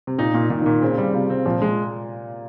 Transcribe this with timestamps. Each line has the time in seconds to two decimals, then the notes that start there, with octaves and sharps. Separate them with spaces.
0.07 C3
0.18 A#2 D#4
0.34 A#2
0.50 A#2 D#3
0.61 D#3
0.66 A#2
0.82 C#3 C4
0.98 G3
1.14 C3 F4
1.30 C4
1.45 A#2 F3
1.62 G#3